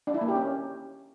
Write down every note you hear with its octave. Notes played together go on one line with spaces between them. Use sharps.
D4
E4
A#3
G4
C#4